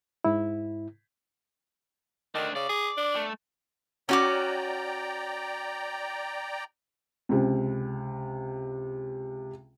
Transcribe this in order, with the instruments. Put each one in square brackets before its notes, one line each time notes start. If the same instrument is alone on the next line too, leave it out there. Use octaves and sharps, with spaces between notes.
[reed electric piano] G#2 E4
[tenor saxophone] D#3 [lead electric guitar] A3 D4
[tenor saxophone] C#3 [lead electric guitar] D5
[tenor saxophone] G#4
D4
[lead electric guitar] A3
[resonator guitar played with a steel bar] C#4 F#4 [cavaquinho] C#5 D6 [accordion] D5 G5 A#5
[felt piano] C#2 C3